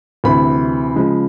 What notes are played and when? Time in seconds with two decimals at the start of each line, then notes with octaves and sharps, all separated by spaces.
0.24 D2 C3 E3 B5
0.96 C#3 F3 G#3